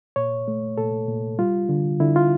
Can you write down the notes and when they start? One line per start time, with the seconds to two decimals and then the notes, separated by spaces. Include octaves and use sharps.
0.16 A#2 C#5
0.48 A3
0.78 A#2 A4
1.09 A#2
1.39 G3 F4
1.69 D3
2.00 D3 E4
2.16 F4